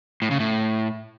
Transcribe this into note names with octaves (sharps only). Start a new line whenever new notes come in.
A2
C#3
A2